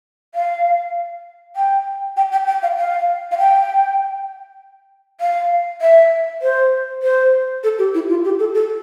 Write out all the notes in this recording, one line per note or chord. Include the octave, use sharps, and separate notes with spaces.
F5
G5
G5
G5
G5
F5
F5
F5
G5
F5
E5
C5
C5
A4
G4
E4
F4
G4
A4
A4